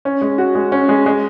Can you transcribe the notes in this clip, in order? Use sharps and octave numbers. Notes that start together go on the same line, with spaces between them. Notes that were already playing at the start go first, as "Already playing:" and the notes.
C#4
G#3
F#4
G#3
C#4
G#3
G#3